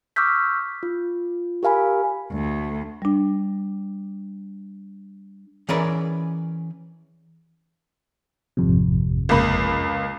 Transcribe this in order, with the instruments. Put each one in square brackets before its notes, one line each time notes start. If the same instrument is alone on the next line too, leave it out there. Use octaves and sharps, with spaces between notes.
[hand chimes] C#6 D6 E6 F6 G6 B6
F4
G4 A#4 F5 G#5 B5
[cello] D2
[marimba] G3 D4
[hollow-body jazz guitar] E3 C#4 G#4 A#4 B4 D5
[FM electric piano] G#1 F2 C3
[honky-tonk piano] C#2 A#3 B5